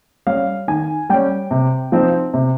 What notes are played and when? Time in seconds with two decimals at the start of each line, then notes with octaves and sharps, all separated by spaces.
0.27 G3 C#4 F5
0.68 D#3 G#5
1.10 G3 C#4 G5
1.51 C3
1.92 F3 C4 D#4
2.34 C3